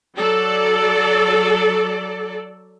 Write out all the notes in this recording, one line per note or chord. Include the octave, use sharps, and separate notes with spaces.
F#3 A4 D5